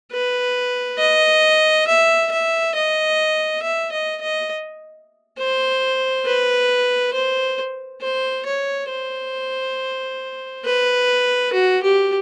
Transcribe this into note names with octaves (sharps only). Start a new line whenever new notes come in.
B4
D#5
E5
E5
D#5
E5
D#5
D#5
C5
B4
C5
C5
C#5
C5
B4
F#4
G4